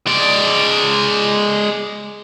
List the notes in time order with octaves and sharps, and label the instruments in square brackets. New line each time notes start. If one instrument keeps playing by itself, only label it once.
[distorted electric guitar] G#3 D5